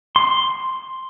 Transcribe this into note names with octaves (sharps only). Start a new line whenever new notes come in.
C6